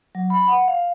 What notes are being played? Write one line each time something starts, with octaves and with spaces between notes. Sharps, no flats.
F#3
B5
F#5
F5